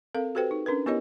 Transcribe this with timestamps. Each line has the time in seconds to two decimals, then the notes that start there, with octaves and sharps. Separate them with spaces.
0.14 C4 A4 A#4 F5
0.35 F#4 G4 A4 B4 C5 G5
0.51 D#4
0.66 C#4 D4 A#4 B4
0.86 B3 E4 G4 A#4 C#5 D#5